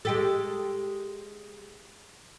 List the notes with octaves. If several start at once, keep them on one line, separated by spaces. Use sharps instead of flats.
G#3 G4 A4